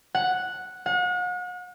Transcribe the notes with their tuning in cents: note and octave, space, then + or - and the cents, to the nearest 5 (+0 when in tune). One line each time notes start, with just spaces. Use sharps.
F#5 -5
F#5 -40